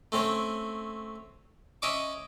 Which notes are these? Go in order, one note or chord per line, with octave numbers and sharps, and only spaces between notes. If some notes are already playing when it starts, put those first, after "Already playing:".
A3 C4 C#4 C#5
C#4 D#5 E5 C#6 D6